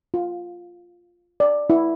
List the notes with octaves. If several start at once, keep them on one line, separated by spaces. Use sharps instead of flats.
F4
D5
E4